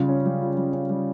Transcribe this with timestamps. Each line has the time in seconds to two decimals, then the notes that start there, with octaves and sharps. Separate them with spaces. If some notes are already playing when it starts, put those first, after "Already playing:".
Already playing: C#3 G3 F4
0.09 C#4
0.26 G3
0.41 F4
0.57 G3
0.73 C#4
0.90 G3